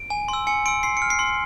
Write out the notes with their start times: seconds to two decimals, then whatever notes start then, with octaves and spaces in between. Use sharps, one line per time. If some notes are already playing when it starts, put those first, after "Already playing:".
Already playing: D7
0.10 G#5
0.28 C6 E6
0.47 G#5 C#7
0.66 C6 E6 D7
0.83 C6 C7
0.97 C#7
1.02 F6
1.10 C7
1.19 C6